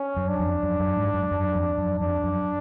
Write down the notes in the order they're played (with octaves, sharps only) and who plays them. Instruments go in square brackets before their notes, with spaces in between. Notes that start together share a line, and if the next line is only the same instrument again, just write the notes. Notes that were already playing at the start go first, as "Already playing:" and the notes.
Already playing: [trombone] C#4
[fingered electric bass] F#2
[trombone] D4
[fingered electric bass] F2
F#2
F#2
G#2
F#2
F#2
F2
F#2
[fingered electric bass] F2 [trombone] D4
[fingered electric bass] F#2